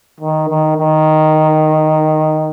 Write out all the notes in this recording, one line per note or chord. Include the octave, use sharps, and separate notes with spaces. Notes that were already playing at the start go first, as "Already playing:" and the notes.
D#3
D#3
D#3